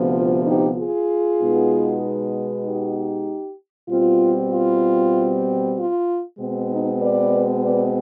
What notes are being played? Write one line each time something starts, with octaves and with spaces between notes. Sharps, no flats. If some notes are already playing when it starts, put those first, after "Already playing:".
Already playing: D2 C3 F3 B3
F4
D#4 G4
F4 G#4
B2 G#3 B3 D#4
D#4 G4
B2 G3 C4 F4
F4
F4
B2 G#3 C4
D#4
B4 D5
B4 D5